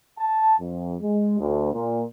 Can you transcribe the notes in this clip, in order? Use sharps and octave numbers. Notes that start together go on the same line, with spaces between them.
A5
F2
G#3
D2
A#2